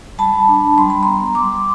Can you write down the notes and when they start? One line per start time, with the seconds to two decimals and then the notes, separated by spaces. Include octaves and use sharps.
0.18 G3 A5 B5
0.48 D4
0.78 G3 C6
0.90 B5
1.03 B3 A#5 C6
1.35 G3 C6 D6